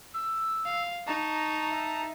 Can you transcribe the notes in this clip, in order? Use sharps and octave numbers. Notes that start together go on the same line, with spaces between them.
E6
F5
D#4 A5 A#5 C#6
E5